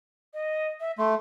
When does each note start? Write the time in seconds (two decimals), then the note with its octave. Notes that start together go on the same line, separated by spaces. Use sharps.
0.34 D#5
0.80 E5
0.98 A3 C6